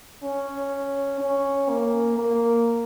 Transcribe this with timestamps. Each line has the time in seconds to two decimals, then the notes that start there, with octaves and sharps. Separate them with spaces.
0.23 C#4
1.21 C#4
1.69 A#3
2.18 A#3